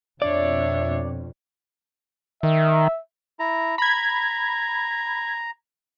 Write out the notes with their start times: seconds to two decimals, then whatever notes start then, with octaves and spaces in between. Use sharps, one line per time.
0.22 F2 B2 D4 C#5 D5 E5
2.43 D#3 E5
3.40 E4 A#5
3.78 A#5 B5 G#6